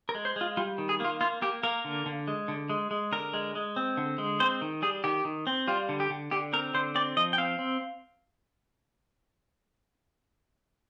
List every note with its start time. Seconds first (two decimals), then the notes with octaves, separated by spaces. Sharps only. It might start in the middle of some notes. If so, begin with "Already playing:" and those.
0.09 A#4
0.15 G#3
0.25 C5
0.36 G#3 F4
0.57 G3 F4
0.78 D#3
0.89 G#4
1.00 A#3 F4
1.21 A#3 F4
1.42 A#3 G4
1.63 A#3 A#4
1.85 D3
2.06 D3
2.27 G#3
2.48 D3
2.70 G#3
2.91 G#3
3.12 D3 A#4
3.34 G#3
3.55 G#3
3.76 C4
3.97 D3
4.18 G#3
4.40 C4 C5
4.62 D#3
4.82 G3 G#4
5.04 D#3 G4
5.25 D#3
5.47 C4
5.68 G3 F4
5.89 D3
6.00 G4
6.10 D3
6.31 D3 G4
6.53 C4 A#4
6.74 D3 C5
6.95 C4 D5
7.17 F3 D#5
7.33 G5
7.38 C4 F5
7.59 C4